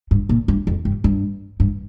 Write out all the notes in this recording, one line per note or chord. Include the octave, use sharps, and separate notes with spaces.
G2
A#2
G2
F2
G2
G2
G2